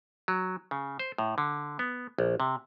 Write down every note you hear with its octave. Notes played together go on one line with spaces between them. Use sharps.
F#3
C#3
C5
A2
D3
B3
A#1
C3